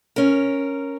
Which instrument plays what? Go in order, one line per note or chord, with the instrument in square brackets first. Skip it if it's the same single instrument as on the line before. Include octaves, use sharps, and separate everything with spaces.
[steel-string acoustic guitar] C#4 A#4